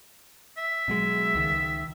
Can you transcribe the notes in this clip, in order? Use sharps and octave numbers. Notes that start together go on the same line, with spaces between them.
E5
B2 F#3 G#3
C#2 D#3